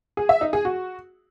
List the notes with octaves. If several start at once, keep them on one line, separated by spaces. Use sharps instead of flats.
G#4
E5
D#4
G#4
F#4